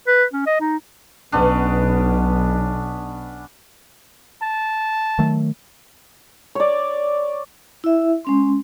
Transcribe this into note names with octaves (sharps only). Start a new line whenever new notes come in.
B4
C#4
D#5
D#4
B1 B3 C#4 D4
A5
D#3 F#3 A3
C#5 D5
E4 E5
G#3 C#4 C6